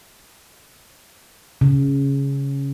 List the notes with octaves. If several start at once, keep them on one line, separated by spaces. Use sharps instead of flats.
C#3